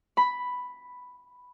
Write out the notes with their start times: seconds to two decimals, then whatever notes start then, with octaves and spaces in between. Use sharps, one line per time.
0.17 B5